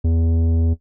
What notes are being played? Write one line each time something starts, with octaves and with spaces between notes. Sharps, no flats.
E2